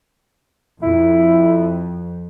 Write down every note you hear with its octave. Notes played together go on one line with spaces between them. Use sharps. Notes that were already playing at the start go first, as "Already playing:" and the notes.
F2 E4